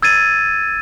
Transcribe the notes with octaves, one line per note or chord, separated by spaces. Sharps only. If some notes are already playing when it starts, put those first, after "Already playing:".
E6 G#6 A6 D#7